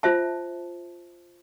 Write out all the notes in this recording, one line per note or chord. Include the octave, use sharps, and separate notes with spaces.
F4 C5 E5 A5